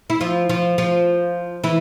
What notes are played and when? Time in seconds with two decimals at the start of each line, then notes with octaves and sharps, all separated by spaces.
0.10 E4
0.21 F3 F4
0.49 F3 F4
0.78 F3 F4
1.64 E3 E4